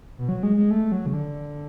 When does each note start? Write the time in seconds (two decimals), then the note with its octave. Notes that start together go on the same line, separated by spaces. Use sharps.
0.18 B2
0.29 F#3
0.43 G#3
0.57 G#3
0.70 A3
0.92 F#3
1.06 C#3
1.13 D3